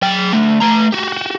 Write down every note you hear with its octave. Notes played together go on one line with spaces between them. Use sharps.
F#3 G5
D2 A3
A3 A#5
F#4 G4